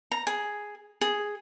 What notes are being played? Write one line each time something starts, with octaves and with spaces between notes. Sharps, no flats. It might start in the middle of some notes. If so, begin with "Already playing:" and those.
A#5
G#4
G#4